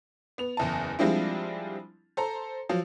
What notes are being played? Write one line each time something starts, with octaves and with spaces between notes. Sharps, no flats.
B3 F7
F#1 E2 A5
F3 G3 G#3 C4 D4 E4
A4 C5 A#5
F3 F#3